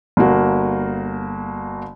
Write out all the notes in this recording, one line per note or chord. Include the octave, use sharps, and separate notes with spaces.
G1 A#3 F#4